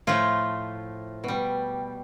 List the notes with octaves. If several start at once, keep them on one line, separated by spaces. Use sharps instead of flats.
A2 F3 A3 F4
B2 G3